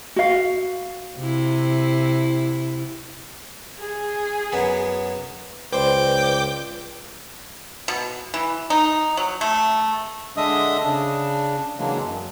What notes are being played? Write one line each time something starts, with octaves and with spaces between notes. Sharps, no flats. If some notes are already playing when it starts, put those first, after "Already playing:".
F#4 F5
C3 E4
G#4
F#2 B3
C#2 B4 C5 D5 G5 D6 G6
B2
E3
D#4
F#3
A3
D3 G#3 D4 D#5 E5 D#6
C#3 D4
C#3 E3 F#3 G#3 A#3 D4
F#2